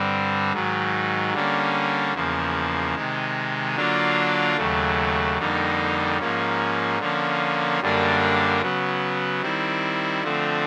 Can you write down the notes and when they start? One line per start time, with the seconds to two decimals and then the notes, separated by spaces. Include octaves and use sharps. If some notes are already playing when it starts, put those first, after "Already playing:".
Already playing: G2 D3 G3 C4
0.53 G#2 D#3 F#3
1.33 D3 G3 A#3 C#4
2.14 E2 C#3 F3 A#3
2.95 C3 D#3 G#3
3.75 D3 F#3 A#3 D4 F4
4.57 D#2 C#3 F#3 A3
5.38 F2 D3 G3 A#3 D#4
6.19 G#2 F3 A#3 C#4
7.00 D3 F3 A#3 C#4
7.81 F#2 D3 G3 A#3 D4
8.61 C#3 F#3 B3
9.42 D#3 G3 C4 E4
10.23 D3 F3 A3 C4